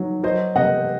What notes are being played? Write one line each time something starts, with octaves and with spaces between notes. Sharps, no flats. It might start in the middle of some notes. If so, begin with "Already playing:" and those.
Already playing: D#3 F#3
F#3 C5 D#5
C3 D#5 F#5